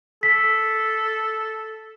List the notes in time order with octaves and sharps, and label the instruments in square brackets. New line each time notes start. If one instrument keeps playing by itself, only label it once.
[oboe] A4 [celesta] B6